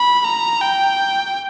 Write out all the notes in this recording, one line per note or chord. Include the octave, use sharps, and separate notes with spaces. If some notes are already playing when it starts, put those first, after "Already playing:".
Already playing: B5
A#5
G5